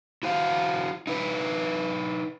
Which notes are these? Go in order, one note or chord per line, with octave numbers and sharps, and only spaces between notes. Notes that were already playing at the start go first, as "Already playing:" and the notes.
E4 F#4 C5 F5
D#4 E4 B4